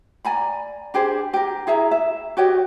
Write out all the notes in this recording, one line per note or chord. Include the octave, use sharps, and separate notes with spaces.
D5 G#5 A#5 B5
D4 G4 G#4 C5
G4 A#4
E4 G#4 E5 A#5
E5
F#4 G4 C#5 D#5